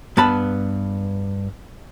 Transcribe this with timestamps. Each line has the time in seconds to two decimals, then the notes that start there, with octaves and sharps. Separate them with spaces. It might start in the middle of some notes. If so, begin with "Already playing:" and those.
0.17 G2 B3 A5 B5